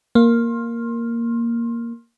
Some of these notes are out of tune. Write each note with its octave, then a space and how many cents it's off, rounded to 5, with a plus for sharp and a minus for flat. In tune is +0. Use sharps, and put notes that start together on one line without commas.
A#3 +0 C6 +30